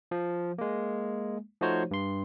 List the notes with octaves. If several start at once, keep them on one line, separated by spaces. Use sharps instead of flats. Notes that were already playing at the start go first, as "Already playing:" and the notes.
F3
G#3 A#3
F3 A3 D#4 F#4 C5 C#5
G2 C6